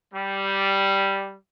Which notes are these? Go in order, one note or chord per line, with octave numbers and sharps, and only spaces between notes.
G3